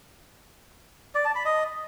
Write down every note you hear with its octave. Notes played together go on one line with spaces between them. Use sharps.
D5
A5
B5
D#5